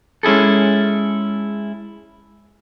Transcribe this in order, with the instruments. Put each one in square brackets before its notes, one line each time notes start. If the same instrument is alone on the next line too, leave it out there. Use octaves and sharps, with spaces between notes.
[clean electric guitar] G#3 C#4 E4 G#4 A4